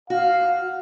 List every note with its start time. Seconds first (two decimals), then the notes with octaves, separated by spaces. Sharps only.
0.10 F#4 F5